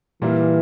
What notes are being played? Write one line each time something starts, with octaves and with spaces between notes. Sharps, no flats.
A#2 E3 G3 A#3 E4